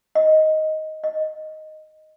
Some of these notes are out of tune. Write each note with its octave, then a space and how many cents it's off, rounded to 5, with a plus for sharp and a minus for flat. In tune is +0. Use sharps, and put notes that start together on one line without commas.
D#5 +5
D#5 -5